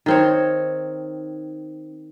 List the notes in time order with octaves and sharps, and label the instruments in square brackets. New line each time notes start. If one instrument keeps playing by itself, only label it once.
[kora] D#3 C4 C#5